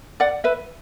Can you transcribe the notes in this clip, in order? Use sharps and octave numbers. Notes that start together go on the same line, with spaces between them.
D5 F#5
B4 E5